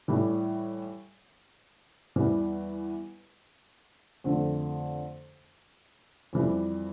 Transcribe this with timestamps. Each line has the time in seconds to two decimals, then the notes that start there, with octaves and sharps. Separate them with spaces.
0.08 A2 E3 G3
2.16 E2 E3 G3
4.24 F2 D3 A3
6.33 F2 E3 G3